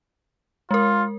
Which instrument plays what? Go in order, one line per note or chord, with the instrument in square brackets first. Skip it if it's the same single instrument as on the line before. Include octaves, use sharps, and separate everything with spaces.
[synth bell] G#3 A#4 [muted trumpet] F4